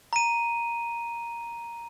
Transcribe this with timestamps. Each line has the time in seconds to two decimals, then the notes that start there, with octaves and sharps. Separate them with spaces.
0.13 A#5 D#7